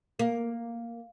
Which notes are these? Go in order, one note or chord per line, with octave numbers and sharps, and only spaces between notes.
A#3